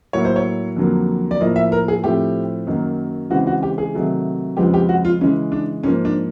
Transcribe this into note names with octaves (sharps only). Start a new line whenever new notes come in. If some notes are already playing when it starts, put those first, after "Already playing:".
A2 F#3 A#3 C#5
C5
C#5
F2 D3 F#3 A#3
D5
A2 F3 A#3 D#5
E5
A#4
G#4
A2 F3 A3 C4 G4
F#2 D#3 F#3 A#3
C#3 E3 G#3 C4 F#4
F#4
G4
G#4
C3 D#3 F#3 A3
F2 C#3 F3 G#3 B3 G4
G4
F#4
F4
C#3 E3 G#3 C#4
D4
G#2 F3 A#3 C#4
D4